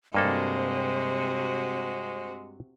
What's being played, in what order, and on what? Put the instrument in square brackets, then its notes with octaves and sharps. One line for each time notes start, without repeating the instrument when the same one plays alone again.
[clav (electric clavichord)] G2 A#3 A4 [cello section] C3 F#4 [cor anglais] G#3 [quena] C5